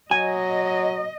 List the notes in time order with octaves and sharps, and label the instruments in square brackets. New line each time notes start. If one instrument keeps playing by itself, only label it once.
[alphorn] F#3 [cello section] D#5 [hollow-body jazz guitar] G#5